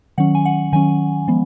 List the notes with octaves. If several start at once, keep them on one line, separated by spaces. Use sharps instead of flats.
D#3 F#3 C#4 F#5
G#5
F#5
D#3 F#3 C#4 G#5
F3 G#3 B3